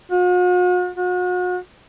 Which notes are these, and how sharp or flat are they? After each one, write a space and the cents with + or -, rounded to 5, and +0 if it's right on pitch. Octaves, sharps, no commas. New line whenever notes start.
F#4 -45
F#4 -40